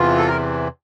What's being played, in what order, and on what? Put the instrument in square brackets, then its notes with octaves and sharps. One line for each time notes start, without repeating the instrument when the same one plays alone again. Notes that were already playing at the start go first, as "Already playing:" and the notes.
Already playing: [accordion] E2 C3 E3 F4
A4
A#4